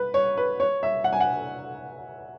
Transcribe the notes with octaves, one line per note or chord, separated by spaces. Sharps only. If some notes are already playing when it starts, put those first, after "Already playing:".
Already playing: B4
C#5
B4
C#5
E5
F#5
G#5
F#5